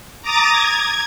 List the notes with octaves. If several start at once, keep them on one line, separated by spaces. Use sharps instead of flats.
A#5 D6 D#6 A6
G#6